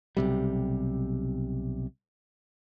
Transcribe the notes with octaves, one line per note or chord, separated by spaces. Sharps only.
B1 C3 G3